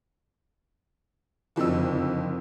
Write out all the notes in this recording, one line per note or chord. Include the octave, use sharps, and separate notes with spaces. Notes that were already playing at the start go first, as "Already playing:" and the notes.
F#1 F2 D3 D#4 E6